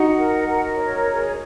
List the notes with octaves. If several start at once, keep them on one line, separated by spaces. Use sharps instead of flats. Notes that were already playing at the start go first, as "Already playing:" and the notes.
Already playing: D#4 F#4 F#5
A#4
A#4
C#5
G#4